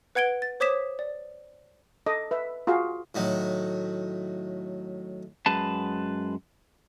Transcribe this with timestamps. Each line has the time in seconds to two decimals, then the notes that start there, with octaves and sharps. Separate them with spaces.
0.15 B4 F#5 G#6 D7 G7
0.42 A6
0.60 C5 C#5 D6 D#6 B6 E7
0.99 D5
2.06 A4 D#5 D6
2.31 B4 E5
2.67 F4 F#4 G#4 F5
3.15 A2 D#3 F#3
5.46 F#2 G#3 B4 A5